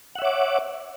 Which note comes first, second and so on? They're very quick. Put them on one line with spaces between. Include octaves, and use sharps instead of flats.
F#5 E5 C#5 D6